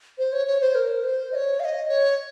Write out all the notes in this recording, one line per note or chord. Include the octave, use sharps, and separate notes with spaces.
C5
C#5
C#5
C5
A#4
C5
D#5
C#5
F5
D#5
C#5